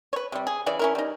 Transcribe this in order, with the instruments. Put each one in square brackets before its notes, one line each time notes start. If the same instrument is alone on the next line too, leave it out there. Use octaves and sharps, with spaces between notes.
[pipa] B4 C#5
C3 G3
G#4
C#3 E3 D5
C#4 E4 A#4
G3 D#4